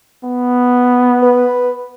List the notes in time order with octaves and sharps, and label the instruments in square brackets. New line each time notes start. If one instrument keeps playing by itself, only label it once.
[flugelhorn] B3
[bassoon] B4